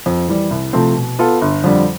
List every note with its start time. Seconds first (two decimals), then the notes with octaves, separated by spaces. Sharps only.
0.06 F2
0.28 E3 G3
0.51 C2
0.73 C3 F3 A3 C4
0.96 B2
1.19 B3 F4 A4
1.42 G1
1.64 F2 D3 G3